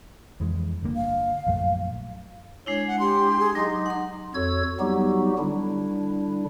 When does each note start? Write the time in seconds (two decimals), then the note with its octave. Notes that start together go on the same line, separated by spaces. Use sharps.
0.40 F2 E3 G#3
0.83 G1 D3 A#3
0.96 F5
1.47 A#1 F#2 A3
2.66 G#3 D4 E4 C#5
2.88 F#5
3.00 G4 C6
3.39 G#4
3.55 F#3 D#4 D6
3.86 F#5 C6
4.35 F2 F#4 A4 C#5 E6 G#6
4.80 F#3 G3 B3 D#4 F#4 G4
5.39 D3 G3 D4 E4